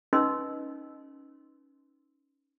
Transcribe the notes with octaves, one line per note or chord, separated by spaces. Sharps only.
C#4 D#4 B4 D#5 C6 E6